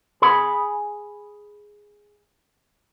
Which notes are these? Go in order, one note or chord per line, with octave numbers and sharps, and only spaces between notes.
G#4 B5